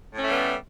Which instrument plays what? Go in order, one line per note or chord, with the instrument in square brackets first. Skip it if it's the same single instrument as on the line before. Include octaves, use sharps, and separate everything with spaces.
[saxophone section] A2
C#4
A3
G3
B3